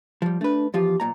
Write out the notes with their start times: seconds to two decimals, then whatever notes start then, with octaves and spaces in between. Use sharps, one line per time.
0.22 F3 G3
0.41 A3 D4 B4
0.74 E2 F3 F4 G4
1.00 B1 A#2 A#5